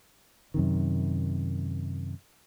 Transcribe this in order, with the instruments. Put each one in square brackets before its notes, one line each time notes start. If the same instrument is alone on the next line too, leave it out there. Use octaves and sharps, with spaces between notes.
[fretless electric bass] F#2 C3 D#3